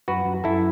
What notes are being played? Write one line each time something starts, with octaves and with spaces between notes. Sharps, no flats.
F#2 F#4 B4
F#2
F#2 E4 A4